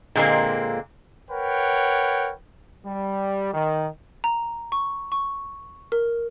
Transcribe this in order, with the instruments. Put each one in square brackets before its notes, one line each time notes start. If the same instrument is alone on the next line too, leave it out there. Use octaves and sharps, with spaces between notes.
[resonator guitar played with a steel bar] A#2 D3 G#3 A#3 C4
[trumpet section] A#4 B4 C#5 F#5 G5
[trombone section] G3
D#3
[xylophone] A#5
C#6
C#6
A#4